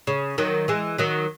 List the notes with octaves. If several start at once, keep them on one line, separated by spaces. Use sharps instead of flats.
C#3
D#3 F#3
E3 G#3
D#3 F#3